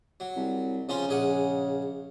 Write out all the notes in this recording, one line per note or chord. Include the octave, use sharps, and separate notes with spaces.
F#3
C2
C#3 F3 C#4 F4
A#1 G#4 F#5